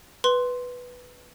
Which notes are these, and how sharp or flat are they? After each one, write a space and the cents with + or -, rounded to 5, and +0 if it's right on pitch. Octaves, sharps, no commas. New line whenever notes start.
B4 +0 C6 +0